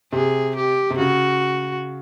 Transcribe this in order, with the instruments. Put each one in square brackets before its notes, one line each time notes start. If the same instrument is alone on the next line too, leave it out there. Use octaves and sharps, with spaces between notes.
[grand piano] C3 [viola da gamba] G#4
[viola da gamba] G4
[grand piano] C3
[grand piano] C#3 [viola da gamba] F#4